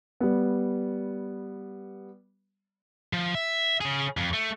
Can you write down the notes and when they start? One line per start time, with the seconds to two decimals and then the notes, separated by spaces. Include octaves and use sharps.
0.20 G3 B3
3.13 F3
3.35 E5
3.81 C#3 G#4
4.17 F2
4.33 A3